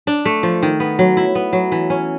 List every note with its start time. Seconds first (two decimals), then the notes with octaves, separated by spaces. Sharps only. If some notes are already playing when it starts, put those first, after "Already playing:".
0.07 D4
0.25 A3
0.43 F3
0.62 D#3
0.80 B3
0.99 F#3
1.17 E4
1.35 B3
1.53 F#3
1.72 E3
1.90 C#4